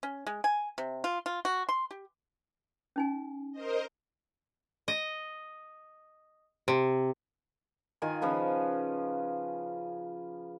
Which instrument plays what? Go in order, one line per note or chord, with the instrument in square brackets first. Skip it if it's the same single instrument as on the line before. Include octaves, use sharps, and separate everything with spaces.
[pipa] C#4
G#3
G#5
C3
F4
F4
F#4
C6
G4
[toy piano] C#4 D#4 G#5
[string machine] A#4 C5 D#5
[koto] D#5
C3
[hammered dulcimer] D#3 F4 G#5
C#3 F3 B4